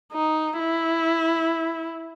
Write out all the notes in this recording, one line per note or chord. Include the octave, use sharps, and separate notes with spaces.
D#4
E4